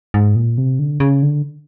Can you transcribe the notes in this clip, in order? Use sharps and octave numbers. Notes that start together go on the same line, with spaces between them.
G#2
A#2
C3
D3
C#3
D3